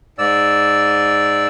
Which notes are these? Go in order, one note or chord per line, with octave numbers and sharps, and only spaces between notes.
G#2 D5 E6